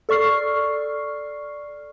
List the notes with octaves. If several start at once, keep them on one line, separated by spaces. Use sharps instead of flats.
A4 D5 C#6 F6 C7